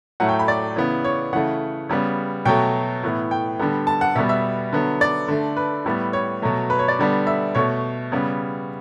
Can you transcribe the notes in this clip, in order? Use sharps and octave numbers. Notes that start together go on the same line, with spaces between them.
A2 F#3 A3 F#5
G5
B5
D5
C#3 E3 B3
C#5
C#3 E3 A3 F#5
C#3 G3 B3
B2 F#3 A3 G5
A2 E3 B3
G5
D3 G3 B3
A5
F#5
B2 G3 B3 E5
E5
D3 F#3 B3
D5
D3 A3
B4
A2 G3 B3
C#5
B2 F#3 A3
B4
C#5
D5
D3 G3 B3
E5
B2 A3 C#5
C#3 G3 B3